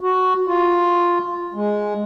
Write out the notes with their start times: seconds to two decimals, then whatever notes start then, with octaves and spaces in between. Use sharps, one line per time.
0.01 F#4
0.48 F4
1.54 G#3